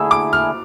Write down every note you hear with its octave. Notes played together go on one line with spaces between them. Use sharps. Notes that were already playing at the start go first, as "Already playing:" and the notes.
Already playing: D3 A3 E4 G#4 E6
D6
F6